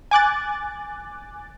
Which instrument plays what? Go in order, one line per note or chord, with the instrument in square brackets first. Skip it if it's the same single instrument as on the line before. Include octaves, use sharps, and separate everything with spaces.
[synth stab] G#5 D6 F#6 A6